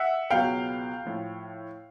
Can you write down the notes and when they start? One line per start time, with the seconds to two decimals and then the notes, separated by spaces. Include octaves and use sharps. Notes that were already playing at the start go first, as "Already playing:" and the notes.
Already playing: E5 F#5
0.30 C#2 B2 F#3 F5 G5
1.05 A2 F3